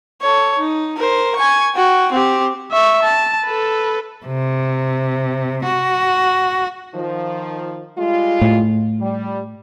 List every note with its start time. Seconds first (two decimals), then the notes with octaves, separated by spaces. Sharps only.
0.21 A4 C#5
0.59 D#4
0.96 A#4 C5
1.36 G#5 C#6
1.75 F#4 G5
2.12 C4 G4
2.72 E5 C#6
3.03 A5
3.45 A4 B4
4.26 C3
5.65 F#4
6.95 D#3 F3
7.97 G3 G#3 F4
8.42 A2
9.00 G3